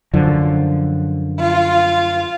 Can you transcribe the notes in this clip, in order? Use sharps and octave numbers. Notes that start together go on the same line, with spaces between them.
F#2 D3 F3
F4